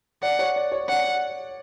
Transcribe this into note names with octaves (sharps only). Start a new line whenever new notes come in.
D5 F#5
C#5
D5
C#5
D5 F#5